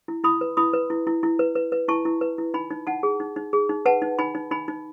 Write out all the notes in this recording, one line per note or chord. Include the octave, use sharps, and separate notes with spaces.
E4
E4 B5 D#6
B4
E4 B5 D#6
B4
E4
E4
E4
B4
B4
B4
E4 A5 C#6
E4
B4
E4
D#4 G#5 B5
D#4
D#4 F#5 A5
G#4
D#4
D#4
G#4
D#4
B4 F#5 A5
D#4
D#4 G#5 B5
D#4
D#4 G#5 B5
D#4